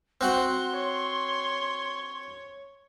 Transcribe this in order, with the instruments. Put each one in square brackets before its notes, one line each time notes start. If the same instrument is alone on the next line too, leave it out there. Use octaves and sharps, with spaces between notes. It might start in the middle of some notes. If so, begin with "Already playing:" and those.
[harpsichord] C4 F#4 F#5 [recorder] C6
[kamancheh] C#5